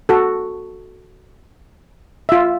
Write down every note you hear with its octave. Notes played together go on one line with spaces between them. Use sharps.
F#4 A4
F4 E5